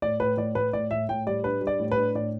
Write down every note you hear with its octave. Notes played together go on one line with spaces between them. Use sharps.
A2 D5
A2 B4
A2 D5
A2 B4
A2 D5
A2 E5
A2 G5
G3 D5
D4 B4
G3
D5
A2
B4
D4
A2 D5